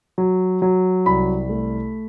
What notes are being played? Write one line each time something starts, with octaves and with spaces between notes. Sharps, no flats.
F#3
F#3
C2 B5
A3